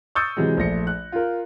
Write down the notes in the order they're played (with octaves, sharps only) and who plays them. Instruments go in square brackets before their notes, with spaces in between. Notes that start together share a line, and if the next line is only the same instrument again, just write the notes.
[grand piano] C#6 D#6 E6 G6 A6 C#7
C3 E3 F#3 G#3
A#1 A3 A#6 C#7
F#6
F4 A#4